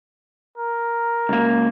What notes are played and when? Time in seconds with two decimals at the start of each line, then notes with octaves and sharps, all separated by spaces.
0.58 A#4
1.29 C#2 A#3